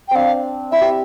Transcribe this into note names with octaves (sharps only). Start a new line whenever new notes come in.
G5
C4 D4 F5
E4 E5
G4